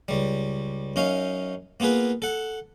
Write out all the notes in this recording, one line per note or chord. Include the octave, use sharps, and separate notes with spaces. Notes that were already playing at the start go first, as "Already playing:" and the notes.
C#2 G3
F#2 C#4 D#4 F5
A#3 B3 F4 G#4 B4
A4 F#5